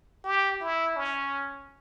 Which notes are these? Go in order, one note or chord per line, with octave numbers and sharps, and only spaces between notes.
G4
E4
C#4